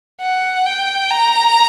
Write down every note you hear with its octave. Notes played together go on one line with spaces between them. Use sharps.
F#5
G5
A#5